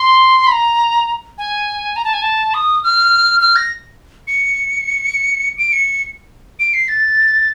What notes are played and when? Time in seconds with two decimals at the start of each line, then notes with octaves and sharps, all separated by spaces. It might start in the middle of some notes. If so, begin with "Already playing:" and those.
Already playing: C6
0.47 B5
0.51 A#5
1.38 G#5
1.96 A#5
2.04 A5
2.13 G#5
2.22 A5
2.54 D#6
2.83 F6
3.41 F6
3.56 A#6
4.27 C#7
5.58 D7
5.72 C#7
6.59 D7
6.74 C7
6.88 A6